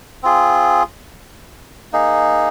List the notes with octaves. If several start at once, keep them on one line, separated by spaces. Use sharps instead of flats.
C4 F4 G#4
A#3 D#4 G#4